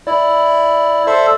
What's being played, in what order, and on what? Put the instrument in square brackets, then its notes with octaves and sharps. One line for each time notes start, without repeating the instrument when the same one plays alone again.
[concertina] E4 [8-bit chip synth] D5
[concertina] A4 C5 E5